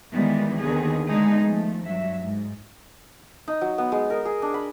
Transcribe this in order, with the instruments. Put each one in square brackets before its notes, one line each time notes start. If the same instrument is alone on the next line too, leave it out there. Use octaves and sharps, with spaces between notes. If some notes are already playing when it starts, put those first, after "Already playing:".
[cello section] D#3 E3 G3 G#3 B3
D#2 D3 D#3 B3 G#4
D3 G#3 A3 B3 D#4 G#4
F3 A3
G2 F#3 E5
G#2
[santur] D#4
F#3
B3
G#3
A#4
G#4
D4
B5